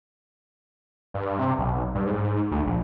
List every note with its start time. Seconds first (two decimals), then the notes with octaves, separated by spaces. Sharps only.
1.14 G2
1.39 C3
1.59 B1
1.95 G2
2.07 G#2
2.51 D2
2.66 A#1